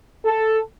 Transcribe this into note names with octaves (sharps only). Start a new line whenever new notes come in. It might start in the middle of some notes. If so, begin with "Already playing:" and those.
A4